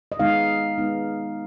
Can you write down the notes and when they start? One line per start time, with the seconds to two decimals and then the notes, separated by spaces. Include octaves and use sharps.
0.12 D#5
0.19 D#3 G#3 B3 D#4 F5
0.78 D#3 G#3 B3 D#4